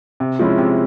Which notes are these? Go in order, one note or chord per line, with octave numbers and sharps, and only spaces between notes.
C3
F3 G#3 C#4 E4
C3